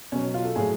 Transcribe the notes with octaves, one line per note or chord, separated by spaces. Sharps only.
B2 F#3 C#4
F4
A4
A2 F#3 G#4